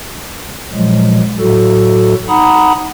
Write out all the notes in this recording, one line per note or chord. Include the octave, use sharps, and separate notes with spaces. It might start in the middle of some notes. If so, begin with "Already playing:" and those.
A#2 F3 F#3 G#3
A2 F#3 F#4 A4
D#4 F#5 A#5 B5 D#6